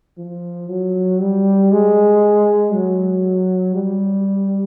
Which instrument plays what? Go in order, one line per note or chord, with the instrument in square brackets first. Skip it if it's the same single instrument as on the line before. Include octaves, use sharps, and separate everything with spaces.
[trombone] F3
F#3
G3
G#3
F#3
G3